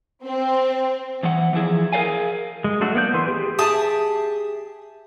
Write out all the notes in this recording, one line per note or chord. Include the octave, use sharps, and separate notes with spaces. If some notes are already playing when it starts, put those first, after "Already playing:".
C4
E2 E3 F#5
E3 F3 E4 G#4
G#4 A#4 C5 D5 F5 G#5
G#3
F#3 A3 D4 F#4
A#3 B3 D5 G6
E3 B4 C6
G4 G#4
G4 G#4 E5 A5 D#6